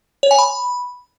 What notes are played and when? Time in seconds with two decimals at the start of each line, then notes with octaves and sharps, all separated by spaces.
0.23 C#5
0.31 G#5
0.39 B5